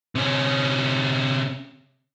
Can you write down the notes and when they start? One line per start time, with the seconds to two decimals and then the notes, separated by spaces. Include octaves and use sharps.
0.15 C3 C#4